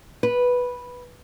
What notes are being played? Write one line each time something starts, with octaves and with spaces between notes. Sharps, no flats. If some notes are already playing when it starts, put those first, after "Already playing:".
B4